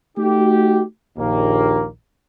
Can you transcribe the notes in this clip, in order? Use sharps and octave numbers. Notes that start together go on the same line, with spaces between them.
A3 D#4 F#4 G4
A#1 D#2 A#3